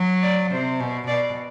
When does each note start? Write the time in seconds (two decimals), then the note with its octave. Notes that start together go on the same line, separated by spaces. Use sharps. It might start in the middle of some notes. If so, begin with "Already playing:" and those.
Already playing: F#3
0.23 D5
0.51 C3 C5
0.80 B2
1.08 B2 D5